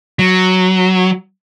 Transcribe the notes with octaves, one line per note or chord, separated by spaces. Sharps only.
F#3